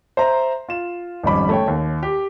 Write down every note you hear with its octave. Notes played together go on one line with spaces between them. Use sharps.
C5 E5 A#5
F4 E7
G#1 F2 G3 C#4 B5 D6
A3 C#5 G5
D#2
G4